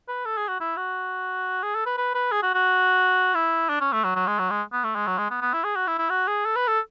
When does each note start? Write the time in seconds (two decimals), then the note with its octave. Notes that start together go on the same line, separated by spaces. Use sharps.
0.08 B4
0.26 A4
0.37 G#4
0.48 F#4
0.60 E4
0.77 F#4
1.63 G#4
1.75 A4
1.86 B4
1.98 B4
2.14 B4
2.32 G#4
2.43 F#4
2.54 F#4
3.35 E4
3.69 D4
3.81 C#4
3.92 A3
4.04 F#3
4.16 F#3
4.27 G#3
4.39 F#3
4.50 G#3
4.72 B3
4.84 A3
4.96 G#3
5.07 F#3
5.18 G#3
5.31 B3
5.42 B3
5.54 E4
5.64 G#4
5.76 F#4
5.88 E4
5.99 E4
6.10 F#4
6.28 G#4
6.45 A4
6.56 B4
6.68 A4